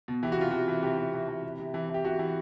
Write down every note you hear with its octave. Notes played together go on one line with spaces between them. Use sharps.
B2
E3 G4
F#4
C3 F4
E3 F#4
E3
C3 G4
C3
E3
E3
C3
C3
E3
E3 G4
E3 F#4
E3